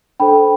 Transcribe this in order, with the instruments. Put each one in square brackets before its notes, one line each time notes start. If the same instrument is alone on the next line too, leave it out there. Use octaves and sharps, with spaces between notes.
[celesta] D4 A4 C5 G5 B5